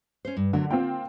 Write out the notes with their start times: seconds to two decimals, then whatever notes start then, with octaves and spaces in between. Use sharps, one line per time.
0.25 C#4 C5
0.37 G2
0.53 D3 F#3 D4 A#4
0.70 A#3 C4 F4 G5